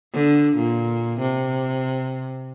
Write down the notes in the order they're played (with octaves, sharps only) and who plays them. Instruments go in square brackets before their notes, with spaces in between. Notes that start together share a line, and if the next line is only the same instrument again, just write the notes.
[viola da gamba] D3
A#2
C3